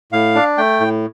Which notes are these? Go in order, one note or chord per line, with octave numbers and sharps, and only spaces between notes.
A2 F5
D4
A3 G5
A2